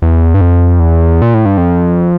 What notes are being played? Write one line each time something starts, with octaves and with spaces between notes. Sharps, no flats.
E2
G2
F2
E2
A#2
A2
G2
F2